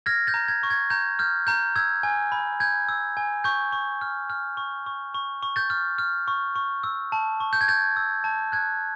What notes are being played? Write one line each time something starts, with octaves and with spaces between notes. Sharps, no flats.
F6 G#6 A#6
G6 A6
A#5
G#6
C#6
G#6
A#5 G6
F6 G6
A#5 G6
E6 G#6
G#5
B5
G6 G#6
E6
G#5
C#6 G6
C#6
F6
F6
C#6
C#6
C#6
C#6
G6 A6
F6
F6
C#6
C#6
E6
A5
C#6
G6
G#6
G6 A6
E6
A5
F#6 G#6